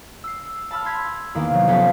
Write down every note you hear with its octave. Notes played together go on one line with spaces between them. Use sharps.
E6 C7
A5 B5 E6 F6
C6 G#6 B6
E2 D#3 A#3
C3 F#3
F1 B3 C#4 A5 G6 B6